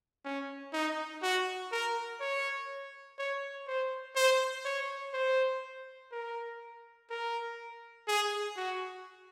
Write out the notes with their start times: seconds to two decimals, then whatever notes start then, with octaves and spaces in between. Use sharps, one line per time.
0.25 C#4
0.73 D#4
1.23 F#4
1.72 A#4
2.20 C#5
3.18 C#5
3.67 C5
4.16 C5
4.65 C#5
5.14 C5
6.12 A#4
7.10 A#4
8.08 G#4
8.57 F#4